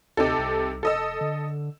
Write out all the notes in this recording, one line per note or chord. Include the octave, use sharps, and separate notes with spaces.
D2 C3 D#4 A4
C2
F1 A4 D#5 E6
D3